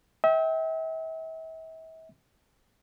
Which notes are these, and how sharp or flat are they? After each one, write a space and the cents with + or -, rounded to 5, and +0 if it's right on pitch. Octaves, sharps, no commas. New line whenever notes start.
E5 -40 G5 -5